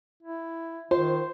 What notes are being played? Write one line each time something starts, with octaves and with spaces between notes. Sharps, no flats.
E4
D#3 F4 C5